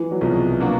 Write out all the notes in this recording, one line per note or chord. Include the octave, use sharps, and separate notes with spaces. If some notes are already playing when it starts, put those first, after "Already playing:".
Already playing: E3
F#3
C2 B2 F3 G#3
B2 F#3 A#3 D4 F#4